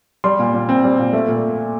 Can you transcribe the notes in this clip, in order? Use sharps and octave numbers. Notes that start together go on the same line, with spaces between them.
G3 C6
A#2
A#2
C4
G3
A#2
A3
A#2